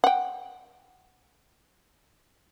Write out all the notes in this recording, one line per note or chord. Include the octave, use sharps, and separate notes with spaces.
F#5 G5